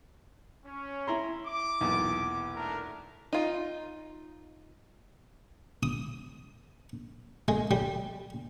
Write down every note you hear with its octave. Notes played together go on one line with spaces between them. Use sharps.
C#4
E4 A#5 C6
D6
B1 E2 A#2
A3 D4 A#4
D#4 F4
D#6
G#3
G3